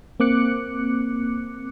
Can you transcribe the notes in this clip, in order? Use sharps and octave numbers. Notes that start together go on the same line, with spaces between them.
A#3 C4 D6 F#6 C#7